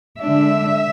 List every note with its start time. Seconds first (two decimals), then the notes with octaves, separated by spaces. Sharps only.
0.22 D3 G#3 D4 E5